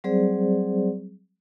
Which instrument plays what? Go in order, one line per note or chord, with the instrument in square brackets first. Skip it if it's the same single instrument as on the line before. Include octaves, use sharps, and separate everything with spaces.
[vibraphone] F#3 G3 C4 G#4 C5 D5